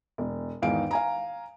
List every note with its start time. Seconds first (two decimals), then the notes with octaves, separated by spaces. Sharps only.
0.18 E1
0.62 E2 G#2 D#3 D#4 F5 D7
0.91 F5 G#5 A#5